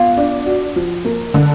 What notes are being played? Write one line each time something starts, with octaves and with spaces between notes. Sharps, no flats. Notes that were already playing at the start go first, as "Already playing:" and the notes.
Already playing: B3 F4
D4
F#4
F3
A#3
D3